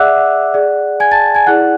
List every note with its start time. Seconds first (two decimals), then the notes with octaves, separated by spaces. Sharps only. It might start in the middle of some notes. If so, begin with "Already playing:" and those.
Already playing: G#4 D5 E5 F#5 D6 E6 F#6
0.54 G#4 D5
1.00 G#5 G#6
1.11 A5 A6
1.35 G#5 G#6
1.46 E4 G#4 D5 F#5 F#6